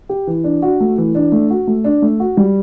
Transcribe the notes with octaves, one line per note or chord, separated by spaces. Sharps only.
G4
E3
D4
F#4
A3
E3
D4
A3
F#4
A3
D4
A3
F#4
G3